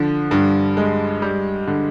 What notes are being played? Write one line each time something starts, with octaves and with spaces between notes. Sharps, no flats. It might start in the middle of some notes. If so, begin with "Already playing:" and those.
Already playing: D3 F3
G2
G#3
G3
D3